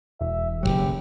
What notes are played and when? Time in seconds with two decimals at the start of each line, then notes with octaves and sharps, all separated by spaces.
0.21 E1 E5
0.63 F#1 D#2 F#3 G4